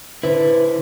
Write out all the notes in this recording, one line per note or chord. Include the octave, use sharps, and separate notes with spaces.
D3 E4 B4 C5